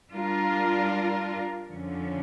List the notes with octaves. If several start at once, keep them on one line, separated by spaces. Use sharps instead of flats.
G3 D4 F4 A#4
F2 D3 F3 C#4